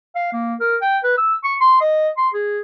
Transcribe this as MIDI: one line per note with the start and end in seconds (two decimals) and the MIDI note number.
0.15 0.31 77
0.33 0.55 58
0.60 0.76 70
0.82 0.98 79
1.03 1.13 71
1.17 1.35 88
1.44 1.55 85
1.60 1.77 84
1.81 2.09 75
2.17 2.29 84
2.34 2.61 68